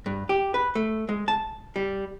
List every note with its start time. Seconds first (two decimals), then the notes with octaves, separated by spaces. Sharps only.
0.06 G2
0.29 G4
0.54 B4
0.75 A3
1.09 G#3
1.28 A5
1.76 G3